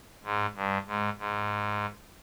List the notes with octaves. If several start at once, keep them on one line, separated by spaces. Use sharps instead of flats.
G#2
G2
G#2
G#2